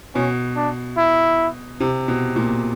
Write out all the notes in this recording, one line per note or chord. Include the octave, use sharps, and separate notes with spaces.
B2 C#4
D4
E4
C3
B2
A#2